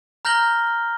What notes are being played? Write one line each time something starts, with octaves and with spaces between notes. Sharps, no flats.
A#5 F6 G6 A#6 F#7 G7